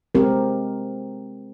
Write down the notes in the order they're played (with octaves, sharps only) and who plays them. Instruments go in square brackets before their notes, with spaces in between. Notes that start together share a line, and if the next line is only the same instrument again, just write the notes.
[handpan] G#3 C4 G4 A#4